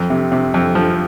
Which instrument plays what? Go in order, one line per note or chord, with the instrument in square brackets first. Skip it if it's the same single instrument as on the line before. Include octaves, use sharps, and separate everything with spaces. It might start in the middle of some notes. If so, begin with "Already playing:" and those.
Already playing: [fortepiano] F2
C3
C3
F2
F3